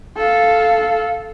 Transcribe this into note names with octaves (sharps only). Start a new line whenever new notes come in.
A4 F5